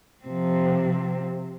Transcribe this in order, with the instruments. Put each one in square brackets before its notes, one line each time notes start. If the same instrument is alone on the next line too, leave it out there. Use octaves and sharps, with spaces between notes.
[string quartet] C3 F3 C4